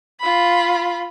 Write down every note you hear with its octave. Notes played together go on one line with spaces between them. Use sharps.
F4 B5